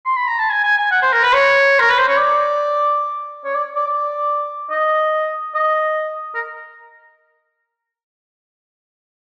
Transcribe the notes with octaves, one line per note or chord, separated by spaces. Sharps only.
C6
B5
A#5
A5
G#5
G#5
G#5
F#5
C5
A#4
B4
C#5
A#4
B4
C5
C#5
D5
C#5
D5
D5
D5
D#5
D#5
A#4